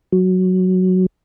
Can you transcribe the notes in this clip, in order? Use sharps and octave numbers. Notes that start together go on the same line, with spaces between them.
F#3